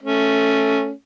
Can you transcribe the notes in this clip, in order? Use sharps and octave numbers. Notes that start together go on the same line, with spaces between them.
A3 C#4